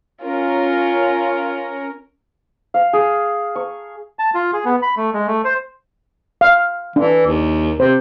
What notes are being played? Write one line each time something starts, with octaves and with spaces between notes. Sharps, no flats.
C#4 F4 A#4
F5
G#4
C#6
A5
F4
G#4
B3
B5
A3
G#3
A3
C5
F5
E3 D4
D#2
C3 C5